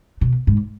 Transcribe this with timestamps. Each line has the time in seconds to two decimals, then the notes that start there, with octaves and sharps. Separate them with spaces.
0.21 B2
0.47 G#2